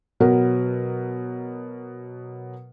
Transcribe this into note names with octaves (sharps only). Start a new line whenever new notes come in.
B2 F#3 B3 A#4